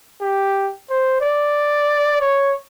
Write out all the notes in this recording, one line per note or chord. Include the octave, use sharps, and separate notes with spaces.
G4
C5
D5
C#5